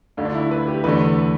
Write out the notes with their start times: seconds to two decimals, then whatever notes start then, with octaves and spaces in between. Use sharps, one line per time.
0.17 D2 D3 A3 F4
0.25 D4
0.34 E4
0.51 B4
0.67 G4
0.84 E2 D3 A3 B4